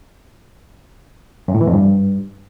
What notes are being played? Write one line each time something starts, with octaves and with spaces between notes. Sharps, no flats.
F#2
A2
E3
F2
G2